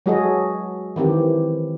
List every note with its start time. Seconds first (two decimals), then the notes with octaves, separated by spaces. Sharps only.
0.06 F#3 G#3 F#4 G#4 A4 D#5
0.96 D#3 E3 C4 G4